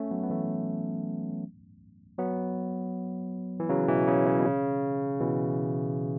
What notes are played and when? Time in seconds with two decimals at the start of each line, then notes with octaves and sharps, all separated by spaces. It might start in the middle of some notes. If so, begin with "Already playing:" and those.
Already playing: A3 C#4
0.11 F#3 B3
0.23 B3
0.30 E3 A3
2.19 F#3 B3
3.60 E3
3.69 C#3 F#3
3.88 B2 E3
4.07 C#3
4.26 C#3
4.40 B2
4.45 C#3
5.20 B2 E3